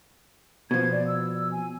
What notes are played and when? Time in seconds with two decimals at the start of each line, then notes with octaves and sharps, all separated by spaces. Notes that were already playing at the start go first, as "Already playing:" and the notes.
0.71 B2 F3 G#6
0.92 D5
1.07 E6
1.52 G#5